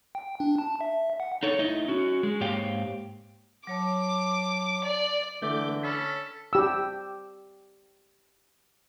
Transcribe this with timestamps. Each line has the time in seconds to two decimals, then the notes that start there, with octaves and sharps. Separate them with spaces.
0.15 G5
0.40 D4
0.58 A5
0.81 E5
1.20 F#5
1.43 D#4 A4 C#5
1.59 A3 D#4 E4 D#5
1.88 C#4 F#4
2.23 G#3
2.41 G#2 A#3 G4 C#5 F5 G5
3.67 F#3 C#5 A5 D6
4.84 D5
5.42 D3 E3 A3 D6 G6
5.83 C#4 A4 B5
6.53 G4 E6